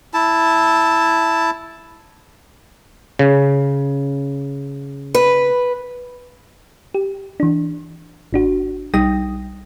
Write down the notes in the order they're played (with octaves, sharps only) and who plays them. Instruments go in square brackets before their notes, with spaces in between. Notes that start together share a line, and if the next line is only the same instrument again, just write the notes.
[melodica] E4 A5
[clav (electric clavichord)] C#3
[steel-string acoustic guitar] B4
[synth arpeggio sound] G4
E3 D4
G#1 D4 F#4
B1 G3 D#4 G5 D#6 A#6